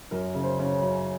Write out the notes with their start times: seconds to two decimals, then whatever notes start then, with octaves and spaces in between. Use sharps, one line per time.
0.11 F#2 A#4
0.34 C#3
0.43 C5
0.59 C#3
0.82 F#2